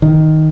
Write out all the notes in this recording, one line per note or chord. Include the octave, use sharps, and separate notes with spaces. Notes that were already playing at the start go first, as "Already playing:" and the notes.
D#3